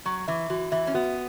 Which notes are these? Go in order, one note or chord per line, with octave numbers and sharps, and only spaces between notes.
F#3 C#6
E3 E5
E3 F#4
E3 E5
C#4
B3 F#4